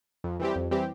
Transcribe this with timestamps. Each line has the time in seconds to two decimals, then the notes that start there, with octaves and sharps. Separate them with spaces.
0.24 F2
0.40 E3 G3 C4 G4
0.55 F2
0.71 E3 G3 C4 G4